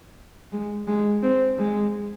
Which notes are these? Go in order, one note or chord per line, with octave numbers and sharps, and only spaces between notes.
G#3
G#3
C4
G#3